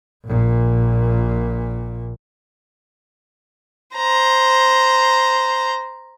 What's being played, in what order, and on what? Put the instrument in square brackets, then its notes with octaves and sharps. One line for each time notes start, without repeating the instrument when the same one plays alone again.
[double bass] A#1 A#2
[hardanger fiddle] C5 A#5